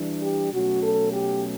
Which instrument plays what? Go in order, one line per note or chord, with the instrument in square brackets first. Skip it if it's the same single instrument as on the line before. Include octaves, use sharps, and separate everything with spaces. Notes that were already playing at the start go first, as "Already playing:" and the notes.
Already playing: [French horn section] E3 G3 D4
G4
B2 F#3 A3 C#4 F#4
A4
G4